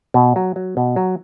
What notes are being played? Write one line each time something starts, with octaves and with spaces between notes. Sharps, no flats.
B2
F#3
F#3
B2
F#3